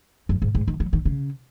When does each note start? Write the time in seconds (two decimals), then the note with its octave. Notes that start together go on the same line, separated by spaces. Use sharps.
0.29 F#2
0.42 G#2
0.55 G#2
0.68 D#3
0.80 F#3
0.93 D#3
1.05 C#3